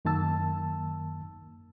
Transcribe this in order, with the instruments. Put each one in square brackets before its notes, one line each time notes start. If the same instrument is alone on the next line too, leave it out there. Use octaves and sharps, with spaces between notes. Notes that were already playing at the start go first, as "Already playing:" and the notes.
[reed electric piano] F#2 D#3 A#3 A5 E6